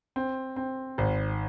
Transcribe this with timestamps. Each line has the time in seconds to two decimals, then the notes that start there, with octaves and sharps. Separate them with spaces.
0.16 C4
0.56 C4
0.98 G#1